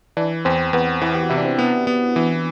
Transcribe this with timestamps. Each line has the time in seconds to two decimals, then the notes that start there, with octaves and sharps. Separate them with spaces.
0.17 E3 D4
0.45 E2 C4
0.73 E2 B3
1.01 E3 B3
1.14 G4
1.23 F#4
1.30 C3 E4
1.37 D4
1.45 C4
1.59 B3
1.87 B3
2.16 E3